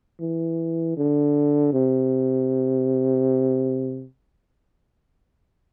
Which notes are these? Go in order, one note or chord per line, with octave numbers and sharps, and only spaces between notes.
E3
D3
C3